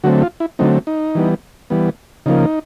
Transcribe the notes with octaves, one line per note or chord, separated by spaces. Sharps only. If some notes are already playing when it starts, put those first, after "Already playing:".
D3 F#3 A3 C4 F#4
F4
E4
D3 F#3 A3 C4 D#4
D#4
E3 G3 B3
E3 G3 B3
C#3 F3 A#3 D#4